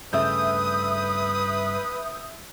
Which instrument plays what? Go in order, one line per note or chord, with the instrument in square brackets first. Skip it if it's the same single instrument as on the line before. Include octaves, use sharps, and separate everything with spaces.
[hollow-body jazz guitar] G2 C#3 A3 [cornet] B4 [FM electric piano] E5 E6 G6 [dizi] D#6